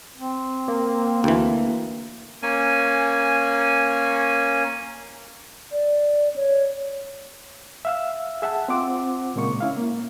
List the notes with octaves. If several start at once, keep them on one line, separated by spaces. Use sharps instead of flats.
C4
A#3
D2 E3
A#3 C#4 G#5
D5
C#5
E5 F5 E6
G#4 E5 F#5 A5
C4 F4 C5 F#5 D6
A#2 C#3 G#3 A#3 C#6
C#4 E4 F5
A#3